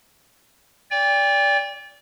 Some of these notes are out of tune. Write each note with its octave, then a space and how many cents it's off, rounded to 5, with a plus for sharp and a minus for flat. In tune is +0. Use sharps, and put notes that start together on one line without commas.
D5 -25 G5 +35